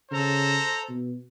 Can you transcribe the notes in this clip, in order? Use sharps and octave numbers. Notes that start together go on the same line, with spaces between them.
C#3 A4 C5 A#5
B2